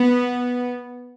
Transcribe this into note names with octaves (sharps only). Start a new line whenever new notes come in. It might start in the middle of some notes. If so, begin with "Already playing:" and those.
Already playing: B3